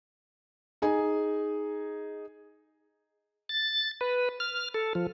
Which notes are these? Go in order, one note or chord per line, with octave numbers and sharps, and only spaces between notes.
D#4 G#4 G#5
A6
B4
F6
A4
F3